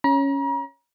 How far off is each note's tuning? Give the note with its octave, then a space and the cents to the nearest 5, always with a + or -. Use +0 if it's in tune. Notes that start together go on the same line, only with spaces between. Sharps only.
C#4 +0 A#5 +40